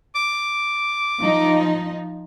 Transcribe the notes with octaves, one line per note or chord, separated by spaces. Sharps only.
D6
F3 D#4